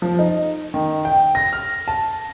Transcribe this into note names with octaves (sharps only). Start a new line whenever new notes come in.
F3
D#4
D#3
G5
A#6
F6
A5